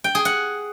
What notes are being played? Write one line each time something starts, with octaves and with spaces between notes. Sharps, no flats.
G5
G#4
F#5